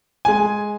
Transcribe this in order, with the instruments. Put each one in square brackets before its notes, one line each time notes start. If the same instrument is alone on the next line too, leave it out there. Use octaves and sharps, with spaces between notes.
[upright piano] G#3 G#5